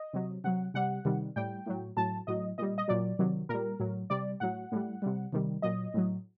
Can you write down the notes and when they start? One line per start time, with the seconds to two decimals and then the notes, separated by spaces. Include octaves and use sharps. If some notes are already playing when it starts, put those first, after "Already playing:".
Already playing: D#5
0.13 C3 F#3
0.44 C3 F#3 F#5
0.74 C3 G3 F#5
1.05 C3 D#3 G3
1.36 A2 G3 G5
1.66 A2 F#3
1.97 A2 F#3 A5
2.27 A2 F#3 D#5
2.58 A#2 G3 D#5
2.78 D#5
2.88 A#2 F#3 D5
3.19 C3 D#3 F#3
3.49 A#2 G3 A#4
3.80 A2 F#3
4.10 C3 G3 D5
4.40 A2 F#3 F#5
4.72 A2 G3
5.02 C3 G3
5.33 C3 D#3 G3
5.62 A#2 F#3 D#5
5.94 A2 F#3